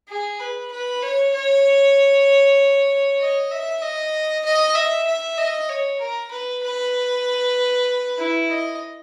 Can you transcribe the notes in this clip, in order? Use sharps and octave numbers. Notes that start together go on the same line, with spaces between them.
G#4
B4
B4
C#5
C#5
D#5
E5
D#5
D#5
E5
E5
D#5
C#5
A#4
B4
B4
E4
D#5